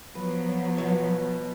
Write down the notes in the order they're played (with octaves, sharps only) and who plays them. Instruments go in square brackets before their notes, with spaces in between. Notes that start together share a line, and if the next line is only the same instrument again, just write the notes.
[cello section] F3 F#3 B3 [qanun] B4
[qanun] B2 C#5 E5